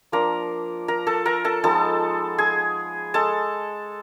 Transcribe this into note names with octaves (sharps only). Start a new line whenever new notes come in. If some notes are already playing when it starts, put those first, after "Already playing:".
F3 A#3 D4 F4 A#4 A#5
A#4 A#5
A4 A5
A#4 A#5
A4 A5
F3 G#3 B3 D#4 A4 A5
G#4 G#5
G#3 A4 A5